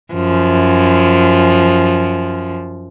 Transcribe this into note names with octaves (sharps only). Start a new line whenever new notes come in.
F#2 F3